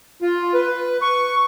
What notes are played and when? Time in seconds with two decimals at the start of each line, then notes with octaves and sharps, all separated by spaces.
0.22 F4
0.54 B4
1.02 C#6